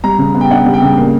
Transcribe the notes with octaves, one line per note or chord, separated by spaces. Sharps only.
G3 A#5
C#3
B3
G5
D4 F#5
G3
G5
C#3
A#3